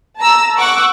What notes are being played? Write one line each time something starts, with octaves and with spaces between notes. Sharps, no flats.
A5 A#5 E6
F#5 C#6 D6 E6 F#6